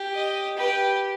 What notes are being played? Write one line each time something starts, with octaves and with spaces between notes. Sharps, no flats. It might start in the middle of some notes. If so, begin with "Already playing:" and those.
Already playing: G4
D#5
G4 B4